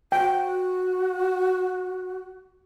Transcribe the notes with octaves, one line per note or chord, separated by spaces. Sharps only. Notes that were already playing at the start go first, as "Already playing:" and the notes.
F#4 G5